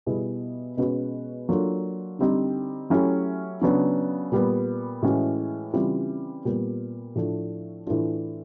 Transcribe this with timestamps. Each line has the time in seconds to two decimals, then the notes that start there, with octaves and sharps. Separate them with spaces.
0.06 B2 G3 B3 E4 G#4
0.77 B2 G#3 C#4 F#4 B4
1.49 F#3 A#3 D4 F4 A4
2.19 D3 G3 C4 D#4 G4
2.90 F#3 A3 C#4 E4 G4
3.61 C#3 F#3 B3 D4
4.32 A#2 G3 B3
5.02 A2 E3 G#3 C#4 F#4
5.73 C#3 E3 G3 C4 F4
6.45 A#2 G3 B3
7.15 A2 F3 A3 D4
7.86 A2 E3 A3 D4 F4